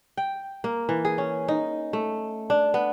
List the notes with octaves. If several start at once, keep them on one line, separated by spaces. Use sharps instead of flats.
G5
A#3
E3
G#4
C#4
D#4
A3
D4
B3